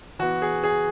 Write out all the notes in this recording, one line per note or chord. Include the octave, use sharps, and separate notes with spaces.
E3 B3 F#4
G#4
G#4